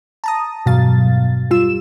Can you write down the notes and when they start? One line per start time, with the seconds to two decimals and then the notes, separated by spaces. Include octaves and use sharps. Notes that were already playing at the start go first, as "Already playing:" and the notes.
0.24 A5 A#5 D#6
0.66 E2 G2 B2 F#3 F5 A6
1.51 G3 F4 E6 E7